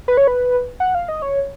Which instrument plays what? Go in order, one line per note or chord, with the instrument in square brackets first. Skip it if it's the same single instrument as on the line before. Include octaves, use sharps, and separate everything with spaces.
[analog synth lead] B4
C#5
B4
F#5
F5
D#5
C#5